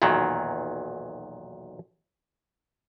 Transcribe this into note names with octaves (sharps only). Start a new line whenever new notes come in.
B1 E2 A#2 D#3 F#3